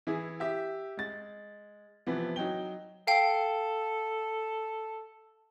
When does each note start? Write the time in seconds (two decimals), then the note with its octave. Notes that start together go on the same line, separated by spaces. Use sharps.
0.07 E3 E4 G#4
0.40 G4 E5
0.97 G#3 A6
2.07 C3 E3 F3 B3
2.36 F#3 D#4 G5 G7
3.07 A4 F5 G5